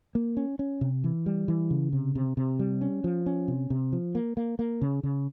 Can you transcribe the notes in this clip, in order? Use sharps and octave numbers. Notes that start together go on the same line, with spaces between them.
A#3
C#4
C#4
C3
E3
G3
E3
C#3
C3
C3
C3
G3
C#4
F3
C#4
C3
C3
F3
A#3
A#3
A#3
C#3
C#3